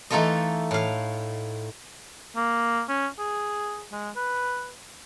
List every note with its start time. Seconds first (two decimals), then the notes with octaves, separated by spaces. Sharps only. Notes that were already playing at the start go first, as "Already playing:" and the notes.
0.10 E3 A3 D#4 F4 A4 D#5
0.71 A2 F5
2.36 A#3
2.89 C#4
3.19 G#4
3.92 G#3
4.16 B4